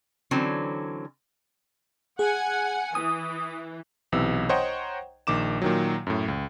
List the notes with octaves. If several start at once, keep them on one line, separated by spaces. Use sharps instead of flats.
D3 E3 F#3 C4 C#4
G#4 F#5 G#5
E3 D#6
B1 C3 E3 E6
C5 C#5 D#5 F#5 G5 A#5
A#1 D#3 D6 E7
A#2 D#3 F#3
F#2 A2
C#2